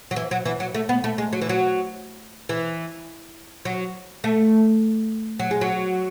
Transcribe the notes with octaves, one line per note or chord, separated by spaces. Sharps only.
F#3
E3
F#3
E3
F#3
A3
B3
A3
G#3
F#3
E3
F#3
E3
F#3
A3
F#3
G#3
F#3